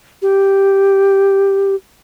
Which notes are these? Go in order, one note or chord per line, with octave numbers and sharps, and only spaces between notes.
G4